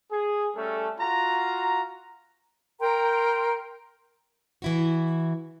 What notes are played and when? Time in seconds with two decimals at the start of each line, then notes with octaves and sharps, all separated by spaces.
0.10 G#4
0.55 G3 A3 C#4 A4
1.00 F4 F#4 A#5
2.80 A#4 G5 A#5 C6
4.62 E3 E4 F#4